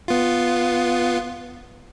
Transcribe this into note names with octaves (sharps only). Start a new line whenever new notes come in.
B3 F4